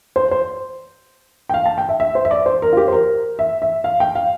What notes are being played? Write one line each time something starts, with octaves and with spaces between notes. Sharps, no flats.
C5
C5
G5
F5
A5
G5
E5
E5
C5
E5
D5
C5
A#4
F4
G4
C5
A#4
E5
E5
F5
G5
F5